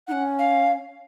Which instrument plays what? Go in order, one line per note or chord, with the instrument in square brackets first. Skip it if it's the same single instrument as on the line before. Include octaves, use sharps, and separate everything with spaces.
[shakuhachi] D#4 [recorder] F#5
[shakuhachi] C#4
[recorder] F5